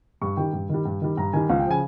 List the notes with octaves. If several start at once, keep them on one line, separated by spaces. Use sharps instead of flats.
G2 C#6
D#3 G3 G5
G2
D#3 G3
G2
D#3 G3
G2 A#5
D#3 G3 G#5
C#2 F5
G5
C#3 F3 G#5